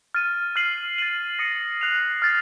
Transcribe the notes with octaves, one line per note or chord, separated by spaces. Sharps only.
F6 A6 D#7
F6 C7 D#7 F#7
A6 D#7 F#7
D#6 A#6 C#7
F#6 C7 F7
F6 A6 C7